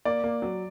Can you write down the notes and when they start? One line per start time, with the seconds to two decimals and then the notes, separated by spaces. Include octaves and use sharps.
0.05 A#3 D5
0.24 A#3
0.42 F#3